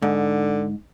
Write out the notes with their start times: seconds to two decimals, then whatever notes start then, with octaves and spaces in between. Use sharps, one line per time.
0.02 G#2 D3